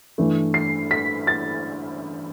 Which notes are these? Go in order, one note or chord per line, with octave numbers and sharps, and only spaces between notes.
G2 E3 A3
C7
B6
A6